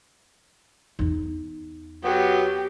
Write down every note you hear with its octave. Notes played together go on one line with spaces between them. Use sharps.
E2 D#4
F#3 B3 G4